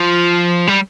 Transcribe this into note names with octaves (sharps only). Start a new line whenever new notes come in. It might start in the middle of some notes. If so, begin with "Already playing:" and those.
Already playing: F3
G3